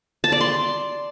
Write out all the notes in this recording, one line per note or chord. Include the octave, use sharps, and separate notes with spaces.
A5
D5
C6